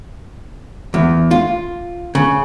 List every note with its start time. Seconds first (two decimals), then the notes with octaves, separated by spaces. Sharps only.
0.94 E2
1.31 F4
2.15 C#3